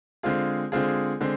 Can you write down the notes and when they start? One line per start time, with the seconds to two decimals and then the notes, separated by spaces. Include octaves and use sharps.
0.23 D3 G#3 C4 F4 G#4
0.72 D3 G#3 C4 F4 G#4
1.21 D3 G#3 C4